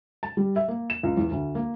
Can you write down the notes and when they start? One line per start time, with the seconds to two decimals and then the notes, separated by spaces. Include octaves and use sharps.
0.23 A5
0.37 G3
0.56 E5
0.68 A#3
0.90 E7
1.03 C#2
1.17 E2
1.31 D2
1.55 A#3